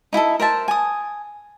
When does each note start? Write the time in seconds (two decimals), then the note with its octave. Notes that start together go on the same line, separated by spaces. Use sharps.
0.13 D#4 E4 G#4 A4
0.40 A#4 C5 E5 A5
0.68 G#5 D#6